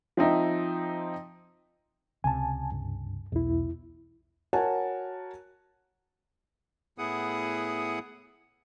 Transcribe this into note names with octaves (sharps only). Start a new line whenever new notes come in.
F3 C4 D#4 E5
C#2 C3 G#5 A5
G2
B1 E2 E4
F#4 A#4 C#5 F#5 G#5 A5
A2 B3 E4 G#4 F#5 D#6